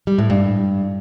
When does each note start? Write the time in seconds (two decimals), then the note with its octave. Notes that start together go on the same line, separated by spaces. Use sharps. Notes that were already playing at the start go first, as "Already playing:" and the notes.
0.07 G3
0.18 A2
0.30 G2